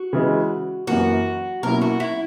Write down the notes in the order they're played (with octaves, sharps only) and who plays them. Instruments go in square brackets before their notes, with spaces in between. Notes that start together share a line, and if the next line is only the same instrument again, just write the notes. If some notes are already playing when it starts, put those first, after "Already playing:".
Already playing: [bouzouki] F#4
[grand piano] C#3 E3 G#3
[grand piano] F#2 E3 A#3 [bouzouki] F#4
[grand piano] B2 F#3 A#3 C#4 E4 [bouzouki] A#4
[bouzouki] F#4
E4